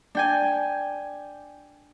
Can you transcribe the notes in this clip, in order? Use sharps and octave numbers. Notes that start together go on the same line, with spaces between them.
D4 G5 G#5